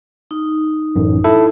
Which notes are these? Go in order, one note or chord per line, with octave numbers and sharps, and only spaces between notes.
D#4
A1 F#2
E4 A4